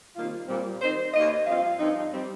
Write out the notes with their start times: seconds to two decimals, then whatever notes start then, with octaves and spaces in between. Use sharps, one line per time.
0.16 C3 D#3 G3 A#3 F4
0.48 A#2 G3 C4
0.81 D#3 C4 D#4 C5
1.13 D#2 D#3 A#3 D#4 D#5
1.46 G2 F3 C4 F4 F5
1.79 G2 F3 C4 D#4
2.12 G3 C4